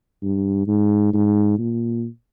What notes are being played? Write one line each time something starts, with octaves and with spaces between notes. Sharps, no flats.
G2
G#2
G#2
A#2